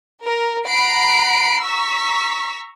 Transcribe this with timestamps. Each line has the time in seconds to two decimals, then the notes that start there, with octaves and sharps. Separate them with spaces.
0.24 A#4
0.66 F#5 A#5 B5 C7 D7
1.63 A#5 C#6 E6 B6